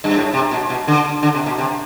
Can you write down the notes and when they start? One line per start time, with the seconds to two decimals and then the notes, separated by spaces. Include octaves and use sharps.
0.04 G2
0.16 A2
0.33 C3
0.51 B2
0.70 B2
0.87 D3
1.23 D3
1.34 C3
1.46 B2
1.58 C3